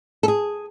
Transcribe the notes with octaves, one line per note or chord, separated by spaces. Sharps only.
A4
G#4